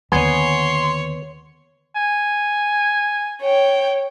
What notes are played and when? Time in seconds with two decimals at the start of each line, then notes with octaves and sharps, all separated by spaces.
0.12 D#2 D3 B3 C#5 G#5 C6
1.95 G#5
3.42 C#5 G5